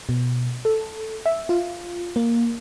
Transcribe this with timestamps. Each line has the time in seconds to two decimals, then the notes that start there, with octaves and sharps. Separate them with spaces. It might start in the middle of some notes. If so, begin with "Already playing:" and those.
0.09 B2
0.65 A4
1.26 E5
1.49 F4
2.16 A#3